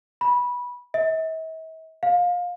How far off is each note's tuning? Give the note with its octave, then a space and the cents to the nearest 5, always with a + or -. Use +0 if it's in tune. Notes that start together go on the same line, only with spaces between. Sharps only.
B5 -15
E5 -45
F5 +25